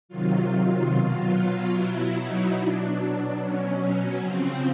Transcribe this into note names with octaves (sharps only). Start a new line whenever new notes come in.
C3 D#3 F#3 F4
F4
B2 F#3
B2 F#3 E4
D#4
B2 F#3 D4
D4
B2 F#3 C#4
C#3 F3 C4